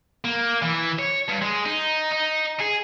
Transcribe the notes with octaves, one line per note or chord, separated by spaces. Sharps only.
A#3
E3
C#5
G2
G#3
D#4
D#4
G#4